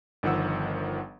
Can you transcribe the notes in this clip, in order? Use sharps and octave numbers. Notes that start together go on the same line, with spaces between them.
G1 D#3 F3 F#5 E6